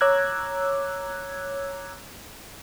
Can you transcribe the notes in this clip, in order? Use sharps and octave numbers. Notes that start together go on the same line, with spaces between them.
C#5 A#5 D6 E6 F#6 G#6